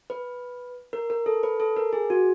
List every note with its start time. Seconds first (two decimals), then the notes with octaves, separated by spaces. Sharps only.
0.10 B4
0.93 A#4
1.10 A#4
1.26 A4
1.43 B4
1.60 A4
1.76 A#4
1.93 G#4
2.10 F#4